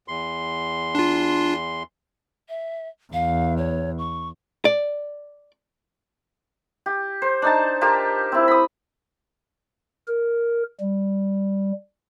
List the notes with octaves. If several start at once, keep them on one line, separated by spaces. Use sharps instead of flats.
E2 C6
D4 F4
E5
E2 F5
C#5
C#6
D5
G4
C5
D4 D#4 A5
F4 G4 A#4 A5
C4 E4
B5 D#6
A#4
G3